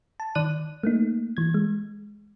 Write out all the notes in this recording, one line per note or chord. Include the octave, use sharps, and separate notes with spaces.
A5
D#3 D5 F#6 D#7
A3 A#3 D#4
E3 G#6
G#3